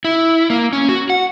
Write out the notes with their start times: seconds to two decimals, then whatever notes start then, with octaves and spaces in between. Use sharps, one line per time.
0.05 E4
0.50 A#3
0.73 C#4
0.89 F#4
1.10 F#5